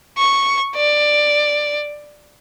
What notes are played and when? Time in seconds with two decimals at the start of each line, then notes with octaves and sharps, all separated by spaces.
0.17 C#6
0.76 D5